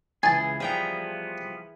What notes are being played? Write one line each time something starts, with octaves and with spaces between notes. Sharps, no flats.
C#2 E3 G#4 G#5 A5
F3 G3 B3 G#4 G5 A#5